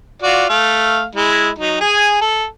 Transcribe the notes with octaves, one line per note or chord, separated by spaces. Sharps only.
F4 F#4 D5
A3 F5
G#3 E4
F#3 D#4
G#4 G#5
A4